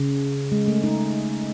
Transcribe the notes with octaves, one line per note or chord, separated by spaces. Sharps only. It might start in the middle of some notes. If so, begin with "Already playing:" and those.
Already playing: C#3
G#3
A3
D#4